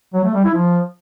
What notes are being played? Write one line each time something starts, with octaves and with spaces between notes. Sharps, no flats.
F#3
A3
G3
E4
F3